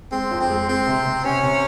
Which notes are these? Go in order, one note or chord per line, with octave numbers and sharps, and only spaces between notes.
G#3 C4
F2
C4
G#3
G#3 C4
C3
C3
C3 C#4
C3